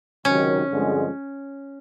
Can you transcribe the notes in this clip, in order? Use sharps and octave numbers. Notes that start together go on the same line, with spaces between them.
C#2 C3 D#3 F#3 C#4
G2 D3 F3 G#3 C4